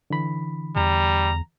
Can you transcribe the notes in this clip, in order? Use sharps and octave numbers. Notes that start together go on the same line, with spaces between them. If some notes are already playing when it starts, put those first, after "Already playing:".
D3 E3 B5
E2 G3 A#5